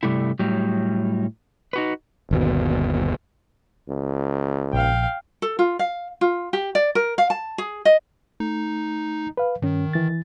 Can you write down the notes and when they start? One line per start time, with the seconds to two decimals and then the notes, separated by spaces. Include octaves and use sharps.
0.03 G2 C3 G3 A3 E4
0.39 A2 F#3 G3
1.73 D#4 F#4 B4
2.31 G1 D#2 B2
3.89 C#2
4.73 A#1 F5 G5
5.42 A4
5.59 F4
5.79 F5
6.21 F4
6.53 G4
6.75 D5
6.95 A#4
7.18 F5
7.30 A5
7.58 G#4
7.85 D#5
8.40 A3 D#4
9.37 B4 F5
9.62 G2 D#3 C#4
9.93 E3 A6